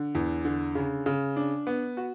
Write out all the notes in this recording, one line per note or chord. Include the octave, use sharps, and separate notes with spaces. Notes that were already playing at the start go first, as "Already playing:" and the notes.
Already playing: D3
E2
D3
C#3
C#3
D4
B3
F#4